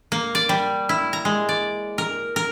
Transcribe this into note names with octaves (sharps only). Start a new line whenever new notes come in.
A#3
D5
G3
E4
A#5
G#3
D5
A#4
A#4